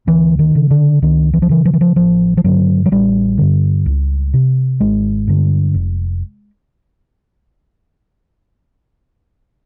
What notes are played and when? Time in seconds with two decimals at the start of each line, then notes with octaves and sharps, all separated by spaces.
0.07 D2 E3
0.39 D#3
0.55 C#3
0.71 D3
1.02 C#2 D#3
1.34 E3
1.42 F3
1.49 C#3 E3
1.65 F3
1.74 E3
1.81 F3
1.96 A1 F3
2.37 F3
2.44 G2 D3 F#3
2.86 F#3
2.91 A1 G3
3.38 G2 D3
3.86 C#2
4.34 C3
4.80 G#1 G#3
5.27 G2 D3
5.74 F1